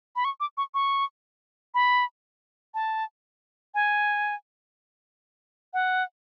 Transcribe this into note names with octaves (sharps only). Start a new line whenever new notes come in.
B5
C#6
D6
C#6
C#6
B5
A5
G#5
F#5